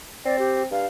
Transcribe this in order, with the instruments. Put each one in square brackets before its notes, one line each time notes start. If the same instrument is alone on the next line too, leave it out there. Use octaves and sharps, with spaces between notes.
[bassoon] C4 [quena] D5
[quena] G4
[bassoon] G2 [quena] F5